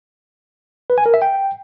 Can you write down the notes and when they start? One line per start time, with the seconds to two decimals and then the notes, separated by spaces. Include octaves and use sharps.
0.90 B4
0.98 G#5
1.06 A#4
1.14 E5
1.22 G5